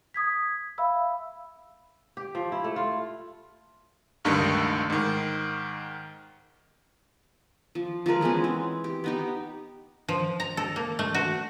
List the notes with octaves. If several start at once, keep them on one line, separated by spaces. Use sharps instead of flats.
D#6 G#6 B6
E5 F5 B5 E6
G4
F3
E4
A3
F4
C#2 G2 D3 D#3 A3
G#2 D#3
F3
F3 G#3 A#4 B4
E3 G#3 B3 C#4
C4
G4
B3 D#4 G4
F3
A#5
A4
A#3
A3
F#4